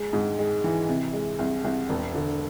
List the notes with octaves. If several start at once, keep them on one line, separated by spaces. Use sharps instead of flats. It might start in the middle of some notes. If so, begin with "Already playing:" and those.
Already playing: G#3
G#2
G#3
E3
C3
G#3
C2
C2
E1
D3